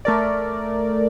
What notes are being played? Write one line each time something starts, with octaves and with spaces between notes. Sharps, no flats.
A3 A#4 D5